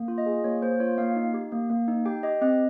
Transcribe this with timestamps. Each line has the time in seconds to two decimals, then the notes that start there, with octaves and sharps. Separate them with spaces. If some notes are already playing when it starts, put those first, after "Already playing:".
Already playing: A#3
0.08 F4
0.18 D#5
0.26 G#4
0.44 A#3 C#5
0.62 A#3 C5
0.80 F4 C#5
0.98 A#3 F5
1.16 D#4
1.34 G4
1.52 A#3
1.70 A#3
1.88 D#4
2.06 G4 G5
2.23 G4 D#5
2.41 C4 D#5